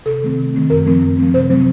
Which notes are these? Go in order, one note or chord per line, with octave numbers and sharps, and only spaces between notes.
C3 A4
D#3 A3 C4
C3
D#3 A3 C4
F#2 A#4
F3 A3 C4
F#2
F3 A3 C4
C3 C5
F#3 A3 C4